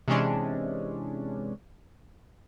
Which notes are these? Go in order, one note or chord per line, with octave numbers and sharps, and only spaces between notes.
C3 E3 G#3 C#4 D4